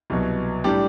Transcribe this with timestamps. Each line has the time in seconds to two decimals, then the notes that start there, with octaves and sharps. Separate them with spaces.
0.10 C2 B2 F#3
0.64 A2 G3 D4 G4